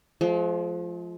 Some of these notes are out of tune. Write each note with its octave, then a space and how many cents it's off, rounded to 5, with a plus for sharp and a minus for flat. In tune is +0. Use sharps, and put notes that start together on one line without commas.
F3 +0 G#3 +45